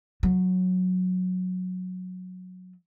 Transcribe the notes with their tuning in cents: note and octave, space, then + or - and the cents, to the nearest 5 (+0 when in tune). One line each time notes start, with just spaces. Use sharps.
F#3 -15